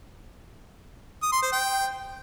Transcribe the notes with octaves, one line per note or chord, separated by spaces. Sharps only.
D#6
C6
C5
G5